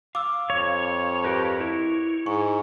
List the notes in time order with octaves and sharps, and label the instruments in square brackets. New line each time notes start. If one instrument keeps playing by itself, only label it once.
[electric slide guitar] F5 [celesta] D6 E6
[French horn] F2 [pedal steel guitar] C#5
[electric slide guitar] G4 A#4 B4
E4
[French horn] G#2 [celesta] C#6